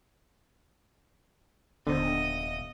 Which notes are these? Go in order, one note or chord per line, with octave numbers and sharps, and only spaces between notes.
D#1 D3 B3 C5 D#5